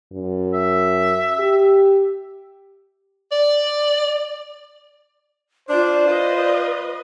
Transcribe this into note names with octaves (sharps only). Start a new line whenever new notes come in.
F#2
E5
G4
D5
D4 F4 C5 D5
F4 B4 D#5